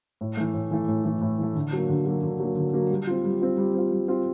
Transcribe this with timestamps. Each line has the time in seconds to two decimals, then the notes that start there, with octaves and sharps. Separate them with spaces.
0.21 A2
0.37 E3 A3
0.54 A2
0.71 E3 A3
0.88 A2
1.05 E3 A3
1.22 A2
1.38 E3 A3
1.55 D3
1.72 F#3 A#3
1.89 D3
2.06 F#3 A#3
2.23 D3
2.40 F#3 A#3
2.57 D3
2.73 F#3 A#3
2.90 G3
3.07 C4 F4
3.24 G3
3.41 C4 F4
3.58 G3
3.74 C4 F4
3.91 G3
4.08 C4 F4